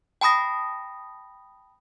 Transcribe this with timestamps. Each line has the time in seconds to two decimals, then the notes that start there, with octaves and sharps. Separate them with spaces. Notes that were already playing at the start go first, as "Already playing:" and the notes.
0.21 G5 A5 B5 D#6 A#6